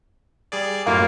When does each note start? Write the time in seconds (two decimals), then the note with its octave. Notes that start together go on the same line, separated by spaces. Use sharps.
0.52 G3 G#4 D5
0.86 F#2 A2 G3 A#3 E4 F4 F5